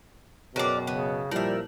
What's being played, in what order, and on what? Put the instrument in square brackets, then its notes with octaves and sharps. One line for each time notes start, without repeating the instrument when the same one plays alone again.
[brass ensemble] F#2 B2 [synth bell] G#4 C#5 G5 [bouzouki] A#4 D5
[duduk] C#3 [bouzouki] B3
[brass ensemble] A#2 F3 G4 [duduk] G3 [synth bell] E4 F#7 [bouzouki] A#4 E5